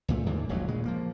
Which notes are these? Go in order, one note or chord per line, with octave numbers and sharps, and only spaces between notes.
C#2 A#2 A3
D#2 G#2 D3
D#1 A#1 G#2 F#3
A#2 C#3 G#3
F3 A#3